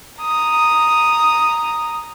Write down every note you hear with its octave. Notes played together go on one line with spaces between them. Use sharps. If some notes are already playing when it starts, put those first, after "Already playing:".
A#5 D#6